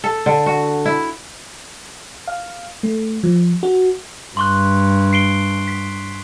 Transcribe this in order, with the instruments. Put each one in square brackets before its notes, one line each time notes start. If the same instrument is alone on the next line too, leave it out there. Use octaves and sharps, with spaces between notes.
[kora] A4
D3
F#4
E4
[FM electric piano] F5
A3
F3
F#4
[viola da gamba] G2 [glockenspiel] C6 C#6 F#6
[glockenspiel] C7 D7 G7
B6